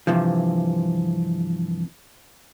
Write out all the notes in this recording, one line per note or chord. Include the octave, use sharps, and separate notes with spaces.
G2 C3 E3 F3